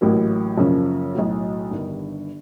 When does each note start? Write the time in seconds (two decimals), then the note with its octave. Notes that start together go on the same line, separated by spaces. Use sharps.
0.01 A1 A2 F#3 A#3
0.58 F#2 C#3 F3 A#3 C#4
1.15 B1 A2 F#3
1.71 G1 G2 D#3